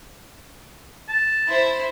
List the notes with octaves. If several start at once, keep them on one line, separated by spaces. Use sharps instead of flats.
A5
E4 C5